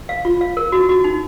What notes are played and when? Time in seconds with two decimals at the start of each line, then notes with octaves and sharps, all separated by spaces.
0.09 F5
0.25 F4
0.41 F5
0.57 A#4
0.72 F#4
0.89 F#4
1.04 D#4